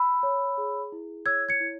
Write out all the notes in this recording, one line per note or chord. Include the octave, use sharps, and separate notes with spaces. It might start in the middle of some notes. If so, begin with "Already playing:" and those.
Already playing: B5 E6
C#5
G#4
E4
C#5 E6 G#6
G#6 C#7
E4